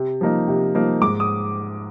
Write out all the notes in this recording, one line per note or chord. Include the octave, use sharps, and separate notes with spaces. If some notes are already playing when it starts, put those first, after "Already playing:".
Already playing: C3
F3 A#3 D#4
C3
F3 A#3 D#4
G#2 D6
D#6